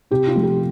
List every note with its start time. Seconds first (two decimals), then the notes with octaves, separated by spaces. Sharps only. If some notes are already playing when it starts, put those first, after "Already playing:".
0.11 C3 G4
0.27 F4
0.35 F3 A3
0.43 G4